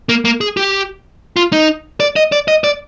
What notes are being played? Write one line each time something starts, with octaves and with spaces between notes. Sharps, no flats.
A#3
A#3
G#4
G4
F4
D#4
D5
D#5
D5
D#5
D5